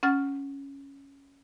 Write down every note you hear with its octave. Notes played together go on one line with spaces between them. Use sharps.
C#4 F#5 F6 A6